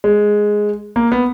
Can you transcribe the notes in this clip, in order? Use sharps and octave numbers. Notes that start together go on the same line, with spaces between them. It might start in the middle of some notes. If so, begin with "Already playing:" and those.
G#3
A#3
B3